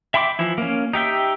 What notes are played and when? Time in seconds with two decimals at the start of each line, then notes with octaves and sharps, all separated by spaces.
0.14 E5 G5 B5 C6 D6
0.39 E3 F3 E4
0.58 A#3 C#4
0.93 D#4 G4 E5 G5